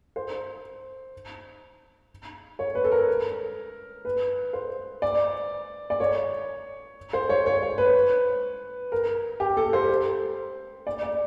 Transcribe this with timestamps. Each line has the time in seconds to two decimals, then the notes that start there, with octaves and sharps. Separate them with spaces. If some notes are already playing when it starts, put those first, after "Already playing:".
0.16 C5
2.59 C#5
2.75 B4
2.84 A4
2.92 A#4
4.05 B4
4.53 C5
5.02 D5
5.90 D5
6.00 C#5
7.13 C5
7.29 C#5
7.46 C#5
7.62 C#5
7.78 B4
8.92 A#4
9.40 G4
9.57 A4
9.73 C5
10.87 D5
11.03 D5